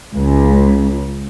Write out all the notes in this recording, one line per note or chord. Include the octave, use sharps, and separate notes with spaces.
C#2